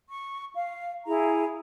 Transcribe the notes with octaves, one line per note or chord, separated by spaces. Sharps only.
C#6
F5
E4 G#4 A#5